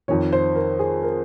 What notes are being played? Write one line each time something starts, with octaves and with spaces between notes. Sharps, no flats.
F2 D#3 C#5
C5
A#4
G#4
A#4